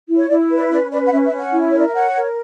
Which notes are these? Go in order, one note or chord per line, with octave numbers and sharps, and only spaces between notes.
E4
C#5
E4 D5
B4
D5
C#4 D5
B4 D5
F#5
C#4 E5
E5
C#4
F#5
E4
C#5
A#4 D5
E5
C#5 F#5
A#4